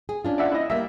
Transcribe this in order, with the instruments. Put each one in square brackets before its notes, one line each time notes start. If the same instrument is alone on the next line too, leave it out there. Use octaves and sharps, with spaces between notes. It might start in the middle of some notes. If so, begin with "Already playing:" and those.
[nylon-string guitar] G#4
C#4 D4 F4
[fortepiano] D5 E5 F#5
E4 D#5
[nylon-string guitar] G3 A#3 [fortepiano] E5